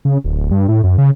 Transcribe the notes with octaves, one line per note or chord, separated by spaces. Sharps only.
C#3
D1
G2
A2
F#2
C#3